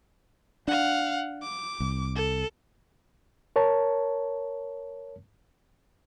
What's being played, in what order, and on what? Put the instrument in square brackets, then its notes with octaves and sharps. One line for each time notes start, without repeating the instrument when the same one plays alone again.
[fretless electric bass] D4 [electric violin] F5 F#5
[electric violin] D6
[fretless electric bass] C2
[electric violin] A4
[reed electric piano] A#4 C#5 A5